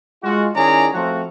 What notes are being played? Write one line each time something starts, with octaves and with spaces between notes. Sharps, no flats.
G#3 F4 F#4
D#3 C#4 E4 G#4 D5 A#5
F3 A3 C4 F4 F#4